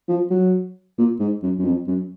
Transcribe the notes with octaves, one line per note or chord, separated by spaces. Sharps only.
F3
F#3
A#2
G#2
F#2
F#2
F2
F#2